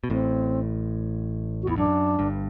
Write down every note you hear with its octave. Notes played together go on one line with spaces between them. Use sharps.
B2
A1 A2 C4
F#4
E2 E4
F#2 D4
G1 G2